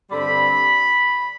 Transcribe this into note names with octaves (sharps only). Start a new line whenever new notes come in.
G2 D3 G3 C4 B5